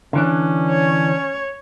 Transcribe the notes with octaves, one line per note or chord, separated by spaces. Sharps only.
D3 E3 C#4 D4
C#5